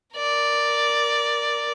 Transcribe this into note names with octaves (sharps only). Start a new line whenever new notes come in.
A#4 D5